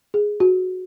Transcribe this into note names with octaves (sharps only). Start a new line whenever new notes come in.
G#4
F#4